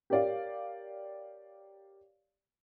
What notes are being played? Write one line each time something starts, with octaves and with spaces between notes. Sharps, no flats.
G4 A#4 C#5 D5 F5